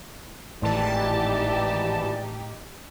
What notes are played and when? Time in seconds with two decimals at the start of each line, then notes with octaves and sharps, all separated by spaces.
0.62 G#1 A2 E3 D#4 G4 D5 A5